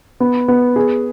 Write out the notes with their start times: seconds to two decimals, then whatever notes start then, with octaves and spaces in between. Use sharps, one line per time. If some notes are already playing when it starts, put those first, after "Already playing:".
0.20 B3
0.48 B3
0.76 G#4